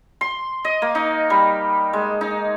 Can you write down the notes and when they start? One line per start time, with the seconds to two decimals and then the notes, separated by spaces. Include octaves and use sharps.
0.21 C6
0.65 D#5
0.82 A#3
0.95 D#4
1.30 G3
1.93 G#3
2.21 D#4